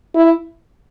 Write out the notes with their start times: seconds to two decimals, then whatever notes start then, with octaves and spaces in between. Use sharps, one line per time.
0.15 E4